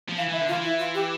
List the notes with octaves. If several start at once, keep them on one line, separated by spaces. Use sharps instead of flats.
F3
E3 F5
E3 E5
D3
F4
E3
E4
F4
G4